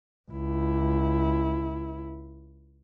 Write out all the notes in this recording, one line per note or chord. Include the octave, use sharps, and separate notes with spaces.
C#2 E4